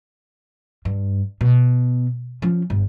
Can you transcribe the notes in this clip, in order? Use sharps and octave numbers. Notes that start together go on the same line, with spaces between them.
G2
B2
F3 C#4
G1